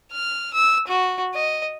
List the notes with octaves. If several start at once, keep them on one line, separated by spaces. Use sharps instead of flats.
F6
E6
F#4
D#5